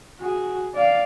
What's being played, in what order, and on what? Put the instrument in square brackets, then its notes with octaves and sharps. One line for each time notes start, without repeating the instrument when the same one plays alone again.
[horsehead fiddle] F#4 G#4
D5 F5